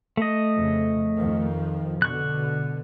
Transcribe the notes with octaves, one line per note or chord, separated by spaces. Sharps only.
A3 D#5
F2 C#3
F2 D#3 F3
B2 D3 C#6 F#6